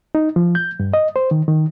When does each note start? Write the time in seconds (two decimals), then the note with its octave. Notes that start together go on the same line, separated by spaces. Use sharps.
0.15 D#4
0.36 F3
0.55 G6
0.80 G2
0.94 D#5
1.16 C5
1.31 D#3
1.48 D#3